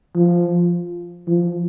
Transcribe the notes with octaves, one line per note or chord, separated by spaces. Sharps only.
F3
F3